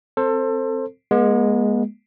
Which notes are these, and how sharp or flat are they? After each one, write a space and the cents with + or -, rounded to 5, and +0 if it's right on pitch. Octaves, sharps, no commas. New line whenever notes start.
C4 +0 A4 +25 C5 +20
G#3 +0 B3 -45